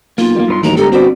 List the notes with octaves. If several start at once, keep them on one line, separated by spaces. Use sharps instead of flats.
B1 A#3 F4
G3 A#3
G2 B4 C6
D#2 A2 E3 F#3 A#5
G1 G#2 G4 A4 A#4
G1 C4 F#4 B4 C5 D5